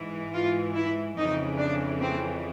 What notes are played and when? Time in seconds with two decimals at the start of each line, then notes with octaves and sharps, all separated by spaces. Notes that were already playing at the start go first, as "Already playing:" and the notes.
Already playing: G#2 E3
0.34 F4
0.75 E4
1.17 F2 C#3 E3 D#4
1.59 D4
2.01 C4